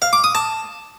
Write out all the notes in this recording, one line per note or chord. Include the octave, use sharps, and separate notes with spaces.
F5
D6
D#6
A5